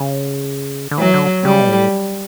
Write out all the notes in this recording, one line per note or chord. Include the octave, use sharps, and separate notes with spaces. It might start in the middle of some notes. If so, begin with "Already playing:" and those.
Already playing: C#3
D3
E3 F#3
D3
C#3 G3
B2
A2